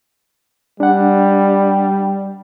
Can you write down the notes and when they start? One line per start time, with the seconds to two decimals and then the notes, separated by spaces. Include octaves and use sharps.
0.80 G3 D4 F#5